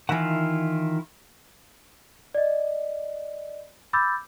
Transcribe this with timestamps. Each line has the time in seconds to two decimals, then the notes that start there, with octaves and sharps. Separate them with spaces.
0.09 D#3 E3 E4 F4 F#5
2.35 D5 D#5
3.93 B5 D6 E6 G6 A6